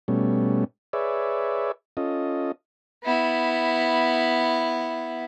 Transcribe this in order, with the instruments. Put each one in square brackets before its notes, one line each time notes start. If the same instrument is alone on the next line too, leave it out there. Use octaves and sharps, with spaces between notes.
[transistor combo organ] B2 G3 A3 C#4
G#4 B4 C#5 D5 E5
C#4 F4 A4 D#5
[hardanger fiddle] B3 E4